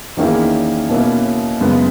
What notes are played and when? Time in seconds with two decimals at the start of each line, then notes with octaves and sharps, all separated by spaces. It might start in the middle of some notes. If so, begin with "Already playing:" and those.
0.17 E2 D#3 A#3 C#4 E4
0.89 B2 A#3 C#4 E4
1.61 F#2 C#3 G#3 B3